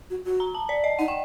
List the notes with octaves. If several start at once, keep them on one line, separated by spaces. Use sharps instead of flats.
F#4
F#4
A#5
A5
D5
D#5
D#4 F#5
G5